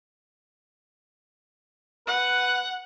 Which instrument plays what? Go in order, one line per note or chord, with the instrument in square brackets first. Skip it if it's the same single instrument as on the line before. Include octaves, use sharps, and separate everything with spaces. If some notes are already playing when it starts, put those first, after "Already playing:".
[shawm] B4 [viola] F#5